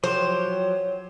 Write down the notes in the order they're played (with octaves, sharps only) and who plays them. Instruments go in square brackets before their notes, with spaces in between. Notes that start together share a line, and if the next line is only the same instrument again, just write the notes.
[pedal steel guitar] F3 F#3 G4 [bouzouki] C5 [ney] C#5